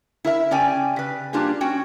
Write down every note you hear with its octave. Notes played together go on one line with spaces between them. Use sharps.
E4 A#4 E5
C#3 C#4 G4 D5 G5 G#5
C#3 B4
G3 A#3 D4 F4 G4 G#4
C#4 F#4 G5